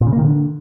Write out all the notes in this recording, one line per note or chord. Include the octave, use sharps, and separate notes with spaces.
A#2
C#3
A#3
D#3
D3